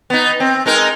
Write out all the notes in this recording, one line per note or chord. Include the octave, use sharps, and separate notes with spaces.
B3 D#4
C4
G#3 D#4 A#4